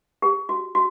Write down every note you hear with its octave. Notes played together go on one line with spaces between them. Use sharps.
G4
F#4
F#4